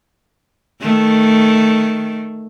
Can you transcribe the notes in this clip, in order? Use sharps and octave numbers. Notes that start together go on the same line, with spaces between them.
D#3 A3